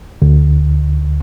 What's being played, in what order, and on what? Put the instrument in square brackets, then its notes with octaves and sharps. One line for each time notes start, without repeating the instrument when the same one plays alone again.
[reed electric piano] D2